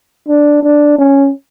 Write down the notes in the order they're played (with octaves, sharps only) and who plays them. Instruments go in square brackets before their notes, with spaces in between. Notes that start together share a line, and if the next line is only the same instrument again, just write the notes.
[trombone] D4
D4
C#4